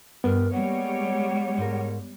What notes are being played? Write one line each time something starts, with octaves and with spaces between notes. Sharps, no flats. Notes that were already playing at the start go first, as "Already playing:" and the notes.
G2 B3 A#4
G3 G#3 A#3 C#5 F#5
G#2 A#4